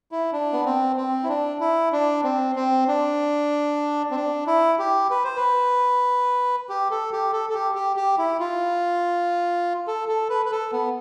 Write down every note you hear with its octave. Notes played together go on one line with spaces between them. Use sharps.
E4
D4
B3
C4
C4
E4
D4
E4
D4
C4
C4
D4
C4
D4
E4
G4
B4
C5
B4
G4
A4
G4
A4
A4
G4
G4
G4
E4
F4
A4
A4
B4
B4
A4
B3